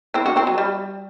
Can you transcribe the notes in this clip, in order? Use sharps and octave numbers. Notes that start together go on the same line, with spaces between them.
C4 E4
D4 F#4
C4 E4
F#3
G3